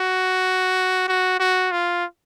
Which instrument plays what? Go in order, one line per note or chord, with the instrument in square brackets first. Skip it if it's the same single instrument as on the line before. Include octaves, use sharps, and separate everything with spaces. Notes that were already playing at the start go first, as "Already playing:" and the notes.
Already playing: [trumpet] F#4
F#4
F#4
F4